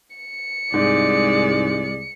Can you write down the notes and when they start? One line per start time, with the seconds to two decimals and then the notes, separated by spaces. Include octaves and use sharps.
0.16 C#7
0.74 C2 G#2 G#3 D5